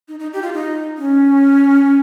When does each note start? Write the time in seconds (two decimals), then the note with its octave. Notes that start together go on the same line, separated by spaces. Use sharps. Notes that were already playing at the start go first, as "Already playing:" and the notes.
0.08 D#4
0.19 D#4
0.33 G4
0.42 F4
0.53 D#4
0.98 C#4